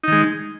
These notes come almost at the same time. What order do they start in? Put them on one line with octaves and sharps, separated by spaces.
D#4 D#3 G#3